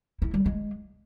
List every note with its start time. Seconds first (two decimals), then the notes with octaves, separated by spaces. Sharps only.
0.22 E4
0.34 G3
0.46 G#3